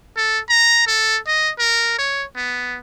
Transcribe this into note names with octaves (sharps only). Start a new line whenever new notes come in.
A4
A#5
A4
D#5
A#4
C#5
B3